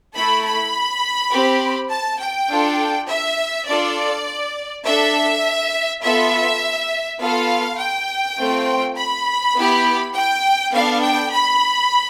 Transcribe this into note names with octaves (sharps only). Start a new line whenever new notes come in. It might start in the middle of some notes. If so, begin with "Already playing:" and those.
A3 E4 A4 B5
B5
C4 G4
A5
G5
D4 F4 A4
E5
D4 F4 A4 D5
D4 A4 E5
B3 F4 A4 E5
B3 F4 A4 F5
G5
A3 C4 F4
B5
B3 E4 G4
G5
B3 D4 A4 F5
G5
B5